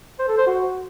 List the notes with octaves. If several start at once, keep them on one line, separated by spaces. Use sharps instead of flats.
C5
A4
C5
F#4